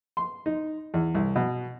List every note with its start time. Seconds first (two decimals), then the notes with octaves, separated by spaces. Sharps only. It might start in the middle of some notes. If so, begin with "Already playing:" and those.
0.17 C6
0.46 D#4
0.94 E2
1.15 C2
1.36 B2